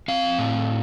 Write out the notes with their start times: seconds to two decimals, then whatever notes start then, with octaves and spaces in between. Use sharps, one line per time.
0.08 C4 F5
0.38 A2